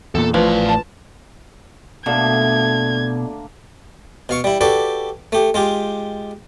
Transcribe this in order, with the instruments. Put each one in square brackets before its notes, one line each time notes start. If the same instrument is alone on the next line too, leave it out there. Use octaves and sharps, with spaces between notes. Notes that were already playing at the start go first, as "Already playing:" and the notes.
[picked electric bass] E2 A#2 [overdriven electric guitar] A4
[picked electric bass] A1 A2 [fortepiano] F3 [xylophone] B4 [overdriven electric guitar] D5 F5
[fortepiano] A5
[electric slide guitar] B2 [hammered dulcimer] D3 A#3 D4 [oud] A3 [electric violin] G#6
[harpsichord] B2 F5 C#6
G3 E4
F#4 G4 A4 B4 D5
A3 G4
G#3 F4 G4